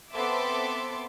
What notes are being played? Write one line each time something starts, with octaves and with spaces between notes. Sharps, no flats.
B3 C4 A4 E5 C6 D6